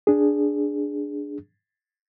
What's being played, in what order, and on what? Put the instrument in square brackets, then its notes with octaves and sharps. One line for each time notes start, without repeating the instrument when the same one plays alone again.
[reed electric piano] D4 G#4